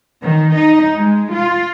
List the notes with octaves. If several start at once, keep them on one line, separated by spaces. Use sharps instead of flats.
D#3
D#4
G#3
F4